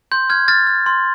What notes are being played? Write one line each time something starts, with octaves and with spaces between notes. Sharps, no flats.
C6 G6
F6 G#6
F6 A6
F6
C6